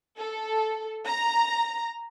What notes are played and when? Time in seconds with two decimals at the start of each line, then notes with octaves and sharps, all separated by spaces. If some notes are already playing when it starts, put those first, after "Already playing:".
0.19 A4
1.06 A#5